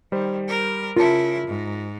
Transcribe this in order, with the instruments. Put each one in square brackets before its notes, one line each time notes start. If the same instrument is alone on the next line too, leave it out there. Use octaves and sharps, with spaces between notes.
[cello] D#3 [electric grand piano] G3 C5
[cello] A#4
[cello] C#3 E4 [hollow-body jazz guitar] F4 A5 [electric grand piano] A#4
[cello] G#2